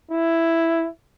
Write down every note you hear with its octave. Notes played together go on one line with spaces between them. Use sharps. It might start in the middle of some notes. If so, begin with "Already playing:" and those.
E4